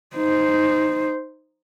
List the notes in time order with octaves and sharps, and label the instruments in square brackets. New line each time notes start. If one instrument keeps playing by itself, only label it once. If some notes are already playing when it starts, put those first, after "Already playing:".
[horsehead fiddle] D#4 C5